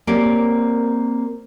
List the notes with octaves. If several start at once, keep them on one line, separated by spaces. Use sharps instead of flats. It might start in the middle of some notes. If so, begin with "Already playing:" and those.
A#3 C4 C#4 G4 A#4 D5